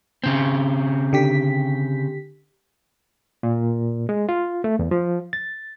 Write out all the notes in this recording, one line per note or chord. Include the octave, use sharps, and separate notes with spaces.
C#3 C4
D3 G4 B6
A#2
G#3
F4
A3
E2
F3
A6